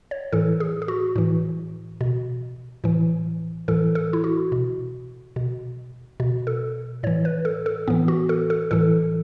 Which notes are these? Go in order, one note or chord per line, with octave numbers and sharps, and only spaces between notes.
C#5
A2 E3 A4
G#4
G#4
F#4
A2 E3
B2
A2 E3
A2 E3 A4
A4
E4
F#4
B2
B2
B2
A4
A2 E3 C#5
B4
A4
A4
A2 E3 B3
F#4
A4
A4
A2 E3 A4